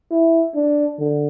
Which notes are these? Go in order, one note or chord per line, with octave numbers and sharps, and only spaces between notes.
E4
D4
D3